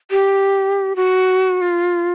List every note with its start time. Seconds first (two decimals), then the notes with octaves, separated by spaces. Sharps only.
0.11 G4
0.96 F#4
1.61 F4